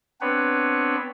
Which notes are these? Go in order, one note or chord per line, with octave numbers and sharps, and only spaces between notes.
B3 C4 D4 B4 C#5